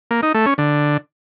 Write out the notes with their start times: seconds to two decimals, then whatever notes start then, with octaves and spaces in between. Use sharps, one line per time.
0.11 A#3
0.23 D#4
0.34 A3
0.46 C#4
0.58 D3